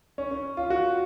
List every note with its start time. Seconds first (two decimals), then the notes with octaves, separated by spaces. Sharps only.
0.18 C#4
0.31 C#4
0.57 F4
0.70 F#4